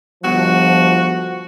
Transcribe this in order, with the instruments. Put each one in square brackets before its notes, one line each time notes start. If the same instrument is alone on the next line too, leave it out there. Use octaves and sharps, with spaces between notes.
[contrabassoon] G1 [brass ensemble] F3 [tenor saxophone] F#4